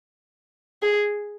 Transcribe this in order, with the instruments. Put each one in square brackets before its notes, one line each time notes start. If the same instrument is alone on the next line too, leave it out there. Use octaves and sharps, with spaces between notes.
[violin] G#4